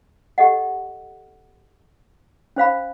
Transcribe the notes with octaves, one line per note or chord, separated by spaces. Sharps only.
G4 A4 D#5 F#5
C#4 C5 F5 B5